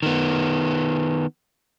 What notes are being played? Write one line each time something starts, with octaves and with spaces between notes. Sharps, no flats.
D#3 B3